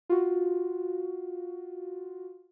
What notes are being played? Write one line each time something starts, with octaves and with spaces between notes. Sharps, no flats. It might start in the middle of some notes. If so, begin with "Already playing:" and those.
F4 F#4